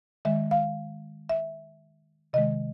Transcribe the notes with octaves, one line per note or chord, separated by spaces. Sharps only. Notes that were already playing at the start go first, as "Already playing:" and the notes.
D#3 G#3 E5
F5
E5
C3 D#3 G#3 D#5